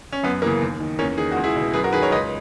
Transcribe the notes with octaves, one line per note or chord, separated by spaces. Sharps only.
C#4
F#2 B3
C#3 E3 A#3
D#2
D#3
E2 A#3 C#4
D#3 G#4
C#2 F#4
E4 G#4
B2
F#2 G#4 B4
F#4 A#4
D#3 G#4 B4
A#4 C#5
C#2 B4 D#5